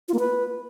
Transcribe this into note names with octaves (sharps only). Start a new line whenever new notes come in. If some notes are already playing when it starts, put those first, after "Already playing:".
F4
A#3
B4